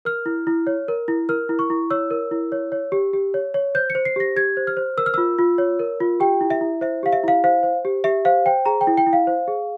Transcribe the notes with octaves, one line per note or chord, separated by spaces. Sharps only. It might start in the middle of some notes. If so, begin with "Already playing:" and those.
A#4 F6
E4
E4
C#5
A#4
E4
A#4 F6
E4
C#6
E4
C#5 E6
A#4
E4
C#5
C#5
G4
G4
C#5
C#5
C5 G6
C#7
C5
C7
G4 A#6
G4 G#6
C5
F6
C5
A#4 E6
F6
F4 E6
F4
C#5
A#4
F4
G4 G5
E4
E5
E4
C5 E5
G4 F5
E5
E4 F5
C5 F5
C5
G4
G4 E5
C5 F5
C5 G5
G#4 A#5
G5
E4
G5
E4
F5
C5
G#4